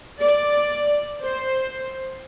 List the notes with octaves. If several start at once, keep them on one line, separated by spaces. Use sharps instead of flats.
D5
C5